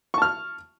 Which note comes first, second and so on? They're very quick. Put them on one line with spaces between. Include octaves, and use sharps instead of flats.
C#6 A5 F6